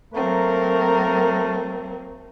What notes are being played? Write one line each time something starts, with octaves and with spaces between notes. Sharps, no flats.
F#3 A3 A#3 C4 A#4